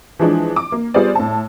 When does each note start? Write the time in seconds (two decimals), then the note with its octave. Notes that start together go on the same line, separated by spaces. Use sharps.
0.19 E3 F3 G#3 D4
0.56 D6
0.72 A#3
0.94 G3 B3 F4 G#4 C5 D5
1.15 A2 A5